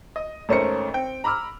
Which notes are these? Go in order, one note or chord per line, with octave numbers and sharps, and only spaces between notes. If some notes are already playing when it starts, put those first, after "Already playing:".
D#5
G#1 A3 C#4 A#4 C5 C#7
C4 G5
A#5 B5 D6 E6 F6